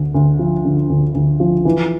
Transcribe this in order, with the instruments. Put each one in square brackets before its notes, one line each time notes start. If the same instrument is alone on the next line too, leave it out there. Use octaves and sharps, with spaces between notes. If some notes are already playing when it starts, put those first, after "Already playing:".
Already playing: [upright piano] D2 D3
D2
F3
D3
D2
D2
F3
E3